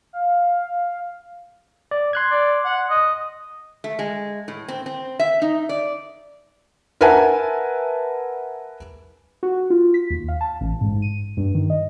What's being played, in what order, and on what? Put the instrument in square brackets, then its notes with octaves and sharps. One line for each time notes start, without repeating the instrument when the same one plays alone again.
[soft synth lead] F5
[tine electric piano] D5
C6 F#6 G#6
[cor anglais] D5
F#5
D#5
[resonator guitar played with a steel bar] A3
G#3
A2
C4
C4
E5
D#4
D5
[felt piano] A#4 B4 E5 F#5 G#5 A5
[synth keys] F#4
F4
B6
D#2
F5
A5
A1
G#2
D#7
G2
D#3
D#5